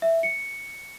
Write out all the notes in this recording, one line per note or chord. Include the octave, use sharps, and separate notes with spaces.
E5
C#7